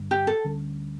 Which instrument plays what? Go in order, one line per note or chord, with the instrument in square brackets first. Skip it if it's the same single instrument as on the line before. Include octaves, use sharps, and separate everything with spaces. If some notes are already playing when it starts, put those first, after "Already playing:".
Already playing: [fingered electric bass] G2 D3 G3 D4
[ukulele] G4
A4
[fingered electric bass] D2 D3 G3 C#4